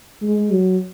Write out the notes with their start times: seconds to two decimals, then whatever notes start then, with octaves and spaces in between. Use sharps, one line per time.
0.22 G#3
0.52 F#3